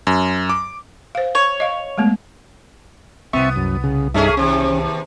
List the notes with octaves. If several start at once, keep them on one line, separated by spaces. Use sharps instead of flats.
F#2
D6
C5 F5
C#5
D#5 F5
G#3 A3 B3
C2 B3 C4 E5 C#6
F#2
C#3
G2 A3 C#4 D#4 G#4 E5
D#2 C3 C#4